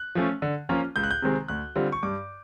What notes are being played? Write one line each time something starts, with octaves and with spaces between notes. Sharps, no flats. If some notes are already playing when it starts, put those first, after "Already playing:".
Already playing: F#6
F3 A3 C#4
D3
F3 A#3 C#4 F4
C#2 G6
F#6
G6
C3 D#3 G#3 C4
D2 F#6
D3 G3 C4 F4
C#6
G2 D6